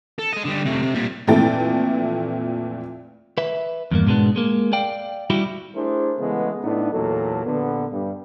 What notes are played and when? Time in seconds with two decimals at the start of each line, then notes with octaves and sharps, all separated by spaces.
0.19 A4
0.33 G#3 D#5
0.45 D3 G3
0.65 C3 A3
0.82 C3
0.94 A#2 G3
1.27 F2 A#2 E3 A3 G5 A6
3.38 B4 E5
3.91 E2 G2 A#3
4.06 G#2 B2 G#3 B3 D4
4.36 G#3 A#3
4.73 D5 F5 G5
5.30 G3 E4 F#4 G4
5.75 A3 D4 E4 G#4 A#4 C5
6.19 C#3 E3 G#3 A3 B3
6.63 A2 B3 D4 D#4
6.93 E2 A#2 F#3 A4
7.46 A#1 A#2 D3 B3
7.92 G2